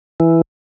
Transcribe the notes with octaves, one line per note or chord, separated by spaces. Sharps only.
E3